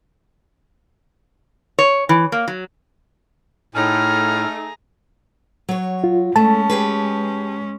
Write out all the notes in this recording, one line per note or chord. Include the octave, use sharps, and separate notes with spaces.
C#5
E3
A#3
F#3
A2 A3 D#4 G#4 A#5 F6
F#3 C#5
F4
G#3 A3 C#4 A5
G4 G#4 B4